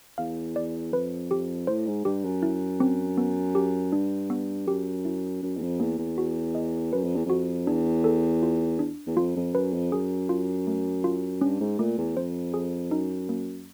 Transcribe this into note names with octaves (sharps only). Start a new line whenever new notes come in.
E2 F5
D5
F2 B4
G4
A2 C5
G#2
G2 G4
F#2
E4
C4
B3
G4
G2 D4
B3
F#2 G4
E4
F#2 C#4
E2
F2
E2 A#3
E2
F#4
D#5
F#2 B4
F2
E2
F2 F#4
E2 D4
A4
F4
D4
E2
F2 F4
F2
F#2 B4
F2
F#2 G#4
F4
A3
F4
G2 C#4
G#2
A#2 A3
E2
F2 C5
G#4
F#2 D#4
A#3